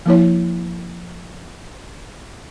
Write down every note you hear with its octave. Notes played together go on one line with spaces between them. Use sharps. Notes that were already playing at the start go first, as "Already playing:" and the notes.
F3 A#3 E4 C#5